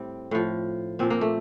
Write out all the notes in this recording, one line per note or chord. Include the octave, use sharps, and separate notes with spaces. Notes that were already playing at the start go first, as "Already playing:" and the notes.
Already playing: A2 G3 C4
A2 F3
A#2 F3 C4
A#3
A3